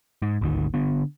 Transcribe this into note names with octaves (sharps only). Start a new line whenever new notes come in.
G#2
G#1 D2 D#3
D3 B3